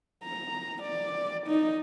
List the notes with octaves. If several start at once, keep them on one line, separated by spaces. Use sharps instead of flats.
A#5
D5
D#4